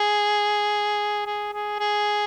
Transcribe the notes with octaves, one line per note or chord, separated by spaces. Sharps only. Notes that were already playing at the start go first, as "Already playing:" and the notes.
Already playing: G#4
G#4
G#4
G#4